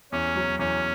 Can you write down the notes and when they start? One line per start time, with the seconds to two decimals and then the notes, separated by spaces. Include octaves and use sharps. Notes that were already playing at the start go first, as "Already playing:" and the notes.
0.12 E2 C#4
0.36 F#3
0.59 E2 C#4